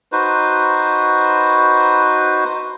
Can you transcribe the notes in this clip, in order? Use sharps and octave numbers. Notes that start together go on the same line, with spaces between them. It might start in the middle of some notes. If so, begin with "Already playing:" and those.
D#4 F#4 B4 C5